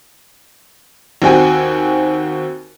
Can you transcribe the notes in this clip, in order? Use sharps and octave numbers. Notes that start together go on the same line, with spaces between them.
D#2 C4 F#4 G5 G#5